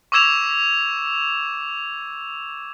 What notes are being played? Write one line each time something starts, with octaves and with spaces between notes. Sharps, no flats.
C#6 D6 E6 G#6 E7 F7